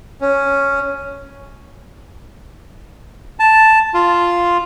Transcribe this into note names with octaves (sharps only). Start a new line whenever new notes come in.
C#4
A5
F4